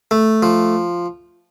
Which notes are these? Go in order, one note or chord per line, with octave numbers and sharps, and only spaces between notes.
A3
F3